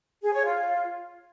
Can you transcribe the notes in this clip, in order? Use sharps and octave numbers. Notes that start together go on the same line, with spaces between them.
G#4
C#5
F4